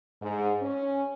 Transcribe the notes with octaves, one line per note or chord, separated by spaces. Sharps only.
G#2
C#4